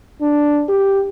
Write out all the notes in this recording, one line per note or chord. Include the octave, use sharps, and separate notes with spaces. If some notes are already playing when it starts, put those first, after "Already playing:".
D4
G4